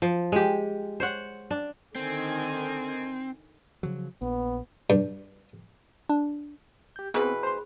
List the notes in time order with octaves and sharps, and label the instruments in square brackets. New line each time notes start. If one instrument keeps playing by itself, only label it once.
[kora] F3
G#3 G4
C5 C#5 F#5
D4
[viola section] D3 D#3 G#5 [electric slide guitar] C4
[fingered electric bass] C#3 F3 F#3
[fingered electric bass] A#1 [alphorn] B3
[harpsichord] G2
[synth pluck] D4
[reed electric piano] G4 G6
[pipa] B2 E3 B4 [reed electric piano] B3 C4 [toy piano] G#4 C#6
[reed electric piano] C5 C6 [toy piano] B5